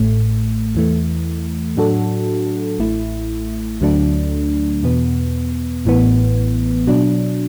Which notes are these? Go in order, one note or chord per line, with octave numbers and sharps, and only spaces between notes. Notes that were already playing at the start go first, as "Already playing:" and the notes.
Already playing: A1 A2 A3
E2 E3 A3
A2 F#3 D4 F#4 A4
A1 A2 A3 E4
D2 D3 F#3 A3 D4
E2 B2 B3
A1 A2 E3 B3
B2 F#3 D4